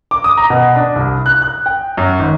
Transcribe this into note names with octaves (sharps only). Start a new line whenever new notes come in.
D6
D#6
A#5
B2
D4
C2
F#6
F#6
G5
F#2
G#1